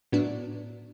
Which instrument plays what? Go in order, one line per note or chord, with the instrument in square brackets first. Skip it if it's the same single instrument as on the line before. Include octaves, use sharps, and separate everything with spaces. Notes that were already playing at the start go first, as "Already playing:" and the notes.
[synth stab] A2 F#3 B3 D4